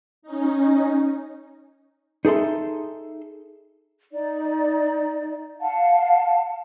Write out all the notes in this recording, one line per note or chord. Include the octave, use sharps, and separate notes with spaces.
C#4 D#4
D#4 G#4 A4 E5 C6
D#4 D5
F5 F#5 A5